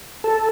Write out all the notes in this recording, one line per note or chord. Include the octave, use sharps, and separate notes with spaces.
A4